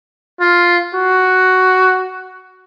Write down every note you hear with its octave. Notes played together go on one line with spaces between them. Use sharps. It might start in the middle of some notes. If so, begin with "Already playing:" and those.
F4
F#4